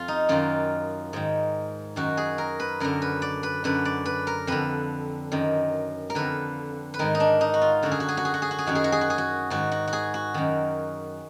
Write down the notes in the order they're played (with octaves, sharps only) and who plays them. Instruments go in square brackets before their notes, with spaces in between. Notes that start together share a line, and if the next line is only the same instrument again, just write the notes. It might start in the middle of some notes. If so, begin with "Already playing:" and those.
Already playing: [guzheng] F2 F4
D#4
F#2 D#3 F4
G#2 D#3
F#2 D#3 F#4
G#4
A#4
B4
F#2 D3 A#4
B4
D5
B4
F#2 D3 B4
D5
B4
A#4
F2 D3 B4
F#2 D#3
A#4
F2 D3 B4
B4
G#2 D#3 A#4
D#4
D4
D#4
F#4
F4
F#2 D3 F#4
G#4
F#4
G#4
F#4
G#4
F#4
G#4
F#4
G#4
F#2 D#3 F#4
G#4
F#4
G#4
F#4
G#4
F#4
G#2 D#3 F#4
F#4
F#4
G#4
F#4
F#2 D#3